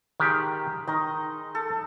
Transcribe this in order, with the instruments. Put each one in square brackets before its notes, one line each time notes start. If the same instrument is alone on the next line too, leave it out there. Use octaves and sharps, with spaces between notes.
[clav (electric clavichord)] D#3 G4 [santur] G#3
[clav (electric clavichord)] D#3 [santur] D#4 D#5
[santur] A4